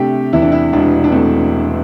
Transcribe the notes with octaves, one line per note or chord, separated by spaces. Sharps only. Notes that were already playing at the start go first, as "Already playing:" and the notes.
Already playing: C3 A3 D4 G4
E2 E4
D4
E4
E1 D4
D4
A3 C4